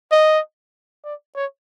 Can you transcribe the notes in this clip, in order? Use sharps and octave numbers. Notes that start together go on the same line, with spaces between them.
D#5
D5
C#5